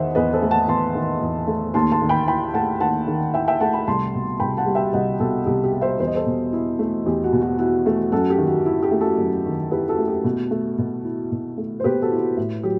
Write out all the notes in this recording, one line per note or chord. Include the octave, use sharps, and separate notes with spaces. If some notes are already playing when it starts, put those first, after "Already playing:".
Already playing: E2 D#3 C5 D#5 E5 F#5
E2 B4 D#5
A4 C5
A3
F#5 A5
E2 A5 C6
D#3
E2
A3
D#2 A5 C6
A5 C6
D#3
G5 B5
E4 G5 B5
A3 F#5 A5
D#2 F#5 A5
D#3
E4 E5 G5
E5 G5
A3 F#5 A5
G5 B5
C2 A5 C6
B2
C2 G5 B5
F#5 A5
G3
E5 G5
C2 D#5 F#5
B2 F#4 A4
C2 G4
G4
G3
C5 E5
E2 C5
D#5
A4 C5
B2
E4
A3
E2 G4
F#4
B2
F#4
E4 F#4
A3
F#2 F#4 A4
G4
D#3
F#4
E4
G4
A3
F#4 A4
F#2
D#3
E4 G4 B4
F#4 A4
A3
G4
B2
A3
B2
E4
B2
A3
C5
B2 G4 B4
F#4 A4
E4
F#4
A2
F#3 G4